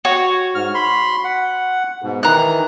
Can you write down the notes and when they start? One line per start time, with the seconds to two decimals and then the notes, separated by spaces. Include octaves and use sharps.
0.05 F#4 C#5
0.55 G#2 F6
0.74 B5 C6
1.24 F#5
2.02 G#2 B2
2.23 D#3 E3 A#5 F#6